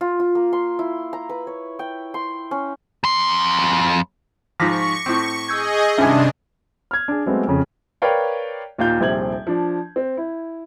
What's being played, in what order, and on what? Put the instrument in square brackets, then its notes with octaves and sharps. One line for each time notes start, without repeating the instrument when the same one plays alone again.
[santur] F4
F4
A#3
C6
E4
A#5
B4
C#5
G5
C6
C#4
[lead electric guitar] F2 C6
[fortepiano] G#2 F3 [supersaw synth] C#6 [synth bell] D6 A#6 B6
[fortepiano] A2 C4
[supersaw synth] G#4 D#5 [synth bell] E6 G6 G#6
[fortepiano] G#1 G2 G#5 [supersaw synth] C3 D4 [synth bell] C#4 E5
[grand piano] F6 G#6
D4 G#4
F#3 G#3 A3 B3 C4
F2 C#3
[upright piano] A#4 B4 C#5 D5 F5 G5
D#2 A#2 F5 G6
D#1 A#1 C3 C4 G#6 F#7
F3 D4
C4
E4